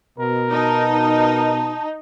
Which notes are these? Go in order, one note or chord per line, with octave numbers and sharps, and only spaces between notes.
B2 A#4
D#4 A5
A#4